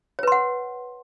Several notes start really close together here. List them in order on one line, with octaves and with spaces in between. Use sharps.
C#5 B4 C6 F#5